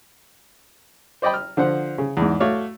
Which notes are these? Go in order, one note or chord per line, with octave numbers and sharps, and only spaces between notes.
C5 D5 D#5 G5 B5
F6
D3 F3 C5 F#5
C#3
E2 G#2
A3 F#4 C#5 D5 F5